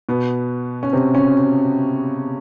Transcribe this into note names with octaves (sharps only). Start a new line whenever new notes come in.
B2 B3
C#4
C3 C4
C#3 C#4